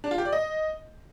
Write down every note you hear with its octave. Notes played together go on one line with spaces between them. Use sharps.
D4
F4
G4
D5
D#5